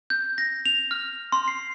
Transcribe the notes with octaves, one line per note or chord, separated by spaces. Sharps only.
G6
A#6
F7
F6
C6
C7